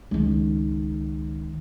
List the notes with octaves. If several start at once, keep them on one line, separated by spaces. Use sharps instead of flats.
C#2 D#3